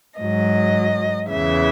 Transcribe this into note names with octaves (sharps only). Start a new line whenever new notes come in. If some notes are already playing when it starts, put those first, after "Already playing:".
G#2 F#3 D#5
E2 C#3 E3 E5